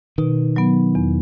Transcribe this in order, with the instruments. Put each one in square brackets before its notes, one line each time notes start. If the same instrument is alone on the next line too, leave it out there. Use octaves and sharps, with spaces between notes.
[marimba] B2 [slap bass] D#3
[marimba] F#3 B3
E2